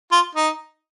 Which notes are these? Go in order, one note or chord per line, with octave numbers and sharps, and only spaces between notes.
F4
D#4